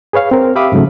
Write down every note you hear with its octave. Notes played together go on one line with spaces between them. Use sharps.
G#4 B4 C#5 F5
C4 A#4
G4 E5 F5 B5 D6 D#6
G#2 C#3 F#3 A3